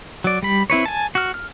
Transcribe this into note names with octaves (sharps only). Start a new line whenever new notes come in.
F#3 D5
G3 B5
C4 E4 B4 C#5
G#5 A5
F#4 F6
F6